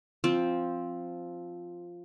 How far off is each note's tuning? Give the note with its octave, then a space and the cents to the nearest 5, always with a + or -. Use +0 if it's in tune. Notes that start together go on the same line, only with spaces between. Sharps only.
F3 +0 C4 +5